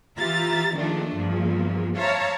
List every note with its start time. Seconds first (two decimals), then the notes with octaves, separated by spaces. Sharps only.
0.18 E3 F4 G4 E5 A#5 A6
0.76 E2 A#2 D#3 F3 A3 D4
1.16 E2 G2 A#2 F3
1.95 C5 C#5 E5 F5 A5 A#5